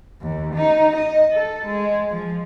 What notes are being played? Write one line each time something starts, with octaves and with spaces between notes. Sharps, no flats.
D#2
D#4
D#5
A4
G#3
F3